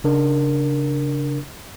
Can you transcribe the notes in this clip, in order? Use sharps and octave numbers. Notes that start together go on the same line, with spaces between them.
C#3 D4 A#4